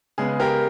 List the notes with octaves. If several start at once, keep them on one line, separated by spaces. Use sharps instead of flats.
C#3 G#3 B3 G#4
G4 A#4